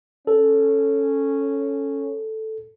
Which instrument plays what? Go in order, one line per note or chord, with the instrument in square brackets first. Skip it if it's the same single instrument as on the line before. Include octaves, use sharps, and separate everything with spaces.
[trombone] C#4 [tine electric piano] A4